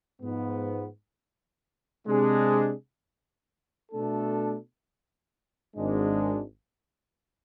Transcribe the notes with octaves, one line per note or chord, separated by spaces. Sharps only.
G#2 F3 B3
C3 G#3 D4 G#4
B2 A3 D4 A4
G#1 G#2 G#3 D4